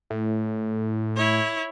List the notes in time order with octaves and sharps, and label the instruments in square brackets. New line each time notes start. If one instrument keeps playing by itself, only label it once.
[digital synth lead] A2
[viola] E4 C#5